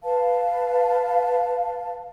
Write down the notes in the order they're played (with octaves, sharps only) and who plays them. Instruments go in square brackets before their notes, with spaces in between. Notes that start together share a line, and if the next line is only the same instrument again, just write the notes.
[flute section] B4 F5 A5